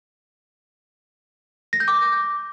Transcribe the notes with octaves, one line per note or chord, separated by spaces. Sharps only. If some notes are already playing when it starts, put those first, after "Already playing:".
A#6
G6
D6